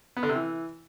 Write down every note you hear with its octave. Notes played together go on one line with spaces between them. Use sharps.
B3
D3
C3
E3